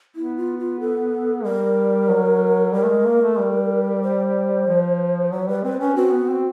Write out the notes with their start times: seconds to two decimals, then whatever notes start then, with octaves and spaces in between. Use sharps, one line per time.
0.16 B3 E4
0.37 F4
0.59 F4
0.80 A4
1.44 G3 A#4
2.10 F#3
2.73 G3 A#4
2.84 A3
2.90 G#3
3.06 A#3
3.22 A3
3.39 G3
4.02 C5
4.67 F3
5.32 F#3 C#5
5.48 G3 B4
5.64 C4 B4
5.81 C#4 B4
5.96 C4 F#4
6.12 B3
6.29 C4